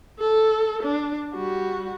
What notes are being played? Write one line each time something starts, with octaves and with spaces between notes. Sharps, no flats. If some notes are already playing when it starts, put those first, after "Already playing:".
A4
D4
G3 F#4